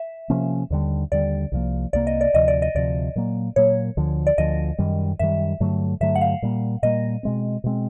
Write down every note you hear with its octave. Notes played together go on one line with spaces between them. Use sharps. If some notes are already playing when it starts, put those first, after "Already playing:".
Already playing: E5
C3 F3 A#3 C#4
D#2 D3 G3
D#2 D3 G3 D5
C2 C3 F3 A#3
C2 C3 F3 A#3 D5
D#5
D5
D2 C3 F3 D#5
D5
D#5
D2 C3 F3 D5
A#2 F#3 A#3
A#2 F#3 A#3 C#5
D2 D3 F3
D5
D2 D3 F3 D#5
F#2 D#3 G3
F#2 D#3 G3 E5
G2 D3 F#3 A3
G2 D3 F#3 A3 E5
F#5
F5
A#2 G3 A#3
A#2 G3 A#3 D#5
B2 G#3 C4
B2 G#3 C4